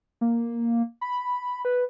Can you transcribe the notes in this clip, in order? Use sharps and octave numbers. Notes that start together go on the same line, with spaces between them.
A#3
B5
B4